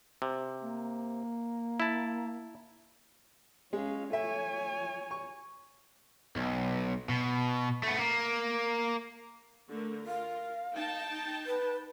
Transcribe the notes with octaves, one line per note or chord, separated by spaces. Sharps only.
C3
A#3
E4 A5
G#3 C#4 F5
A3 C#5 E5 G#5
C#6
B1
B2
A3 B3
A#3
D3 A3 A#4
F4 A#4 F5
D#4 G5 A5
B4